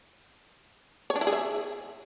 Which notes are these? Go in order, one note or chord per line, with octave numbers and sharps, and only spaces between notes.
C#5
D4
E4
G#4
E5